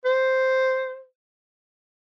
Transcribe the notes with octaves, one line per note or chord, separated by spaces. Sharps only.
C5